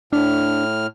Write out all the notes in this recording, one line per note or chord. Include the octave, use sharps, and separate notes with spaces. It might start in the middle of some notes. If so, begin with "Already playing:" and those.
A2 D4 F6